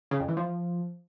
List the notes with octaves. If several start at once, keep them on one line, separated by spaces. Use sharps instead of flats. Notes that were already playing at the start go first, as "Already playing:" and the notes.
C#3
F2
E3
F3